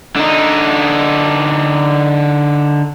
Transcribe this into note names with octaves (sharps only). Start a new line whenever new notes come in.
D3 D#4